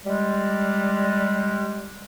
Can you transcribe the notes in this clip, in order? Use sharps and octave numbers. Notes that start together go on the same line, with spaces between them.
G3 G#3